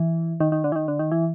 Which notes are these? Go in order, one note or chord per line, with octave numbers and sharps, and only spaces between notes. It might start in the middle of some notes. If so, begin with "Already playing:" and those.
Already playing: E3
D#3
D#3
D3
E3
D#3
D3
D#3
E3